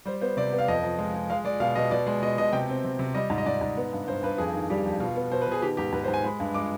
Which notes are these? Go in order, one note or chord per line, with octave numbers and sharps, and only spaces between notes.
G3 C5
B3 C5
C3 D5
B3
F5
F2 D#5
F3
G#3
G#3
G#3 F5
G#3 D5
B2 F5
B2 D#5
B2 D5
G#3
B2 D#5
B2 D#5
C3 G5
C4
C3
C3
G3 D#5
G#2
D#5
G#2 D5
G#2
B3
G2
G2 C5
G2 B4
F2 G#4
D#3
G3 G4
F2
B2 F4
B3
B2 C5
B4
B2 G#4
D#3 G4
G#2 G4
G#2 B4
C5
G#2
G#5
G#3 B5
G2
G#3 D6